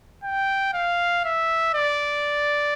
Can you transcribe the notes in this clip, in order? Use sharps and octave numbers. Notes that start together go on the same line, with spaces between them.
G5
F5
E5
D5